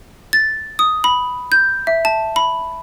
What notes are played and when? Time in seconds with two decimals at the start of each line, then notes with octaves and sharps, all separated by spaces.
0.33 A6
0.79 D#6
1.04 B5
1.52 G6
1.87 E5
2.05 A5
2.36 B5